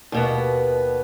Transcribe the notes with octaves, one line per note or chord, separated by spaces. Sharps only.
D#2 B2 B3